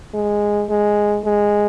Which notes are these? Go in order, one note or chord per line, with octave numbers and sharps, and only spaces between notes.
G#3
G#3
G#3